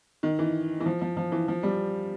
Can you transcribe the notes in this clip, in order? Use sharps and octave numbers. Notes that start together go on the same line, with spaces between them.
D#3
E3
E3
F3
F3
F3
E3
F3
G3